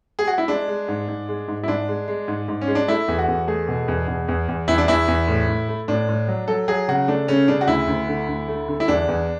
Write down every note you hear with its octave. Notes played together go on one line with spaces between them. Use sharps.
G#4
F#4
E4
G#3 D4
G#3
G#2
G#2
G#3
G#2
E4
G#2 D4
G#3
G#3
G#2
G#2
C#4
G#3
D4
A3 E4
E2
F#4
E2
A3 G#4
B2
E2
E2
E2
E2
E2 E4
D4
E2 E4
E2
A2
A2
A3
A2 D4
A2
F#3
F#3 A4
F#3 G#4
C#3 F#4
A3 D4
C#3 C#4
C#3 D4
F#4
D2 E4
D2
D3
D2
A3
D3
E4
E2 D4
E2